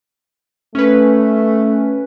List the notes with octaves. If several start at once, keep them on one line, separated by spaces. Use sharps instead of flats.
A3 C#4 B4